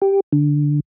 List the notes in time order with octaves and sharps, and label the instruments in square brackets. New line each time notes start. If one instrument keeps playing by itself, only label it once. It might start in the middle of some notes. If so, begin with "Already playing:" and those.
[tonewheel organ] G4
D3